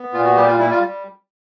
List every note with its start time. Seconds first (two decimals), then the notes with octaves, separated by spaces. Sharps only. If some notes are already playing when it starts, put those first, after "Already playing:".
Already playing: B3
0.13 A#2 F4
0.24 F#4
0.36 G3 G4
0.48 F4
0.59 G3 E4
0.71 F4
0.82 G3